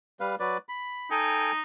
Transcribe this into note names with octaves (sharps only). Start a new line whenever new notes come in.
G3 B4 F5
F#3 B4 D5
B5
D#4 A4 G5 G#5